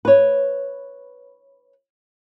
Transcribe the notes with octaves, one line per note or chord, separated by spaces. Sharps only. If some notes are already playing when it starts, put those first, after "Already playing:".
B4 C#5